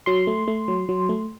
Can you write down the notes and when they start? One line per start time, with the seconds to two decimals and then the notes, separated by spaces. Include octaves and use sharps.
0.06 F#3 C6
0.27 A3
0.48 A3
0.68 F#3
0.89 F#3
1.09 A3